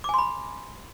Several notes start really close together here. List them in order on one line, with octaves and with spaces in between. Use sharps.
D6 G#5 C6 B5